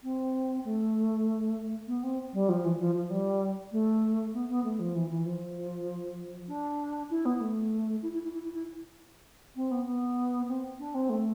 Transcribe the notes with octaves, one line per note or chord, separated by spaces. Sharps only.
C4
A3
B3
C4
G3
F3
E3
F3
F3
G3
A3
B3
B3
A3
F3
E3
E3
F3
D4
E4
B3
A3
E4
E4
E4
E4
E4
E4
C4
B3
B3
C4
D4
C4
A3